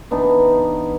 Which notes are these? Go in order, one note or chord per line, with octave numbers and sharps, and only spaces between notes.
E3 B3 D4 D#4